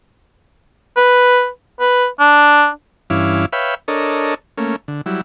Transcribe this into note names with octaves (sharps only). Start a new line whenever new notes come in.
B4
B4
D4
G2 E3 C#4 E4 F5 D6
B4 C#5 E5 F5 G5 B5
D4 A4 A#4 C#5 D#5
A3 A#3 C#4
D3
F#3 G3 E4